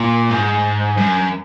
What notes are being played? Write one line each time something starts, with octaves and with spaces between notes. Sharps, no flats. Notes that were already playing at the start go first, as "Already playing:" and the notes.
Already playing: A#2
G#2
F#2